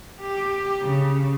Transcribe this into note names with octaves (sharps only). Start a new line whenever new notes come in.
G4
C#3